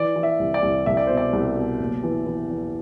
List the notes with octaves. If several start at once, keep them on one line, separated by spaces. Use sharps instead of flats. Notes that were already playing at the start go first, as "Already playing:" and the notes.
Already playing: E3 D5
E3
E5
C2
D5
C2
C2 E5
D5
B2 C5
D5
C2
B2
F#1
E3
E3
E2